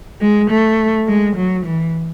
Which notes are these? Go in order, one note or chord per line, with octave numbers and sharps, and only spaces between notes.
G#3
A3
G#3
F#3
E3